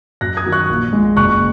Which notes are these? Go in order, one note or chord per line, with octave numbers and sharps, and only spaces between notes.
F#2 F#6 A#6
D#6 G#6
D#3 F#3
C#6 F#6
A#1
A#2 G#3
F#1 C#6 F#6